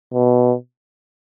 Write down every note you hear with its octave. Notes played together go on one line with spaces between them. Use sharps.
B2